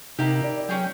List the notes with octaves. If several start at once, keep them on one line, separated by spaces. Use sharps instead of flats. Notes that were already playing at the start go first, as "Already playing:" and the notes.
C3 A#3 D#4 E4 G4
D5
F#3 C#4 G#4 G5